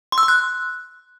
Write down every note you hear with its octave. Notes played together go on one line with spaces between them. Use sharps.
C6
E6
C6
F#6